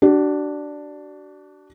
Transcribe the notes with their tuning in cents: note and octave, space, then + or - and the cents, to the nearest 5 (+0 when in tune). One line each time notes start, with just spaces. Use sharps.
D4 +0 F#4 +40